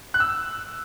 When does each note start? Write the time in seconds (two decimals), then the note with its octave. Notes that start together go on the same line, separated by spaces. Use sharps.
0.14 F#6
0.20 E6